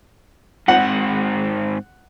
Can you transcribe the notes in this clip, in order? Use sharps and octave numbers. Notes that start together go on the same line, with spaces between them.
G#2 C4 F#5